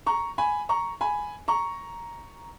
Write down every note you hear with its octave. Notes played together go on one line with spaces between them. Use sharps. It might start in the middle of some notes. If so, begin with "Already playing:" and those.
A#5 C#6
G#5 B5
A#5 C#6
G#5 B5
A#5 C#6